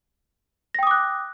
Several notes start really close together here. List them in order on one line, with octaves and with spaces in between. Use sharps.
A#6 G5 D#6 D6 F#6